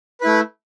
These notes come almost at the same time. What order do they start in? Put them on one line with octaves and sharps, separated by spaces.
B4 E4 A3